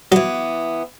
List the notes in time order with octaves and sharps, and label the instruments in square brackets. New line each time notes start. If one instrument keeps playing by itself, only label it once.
[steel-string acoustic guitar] E3 B3 [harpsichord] F#3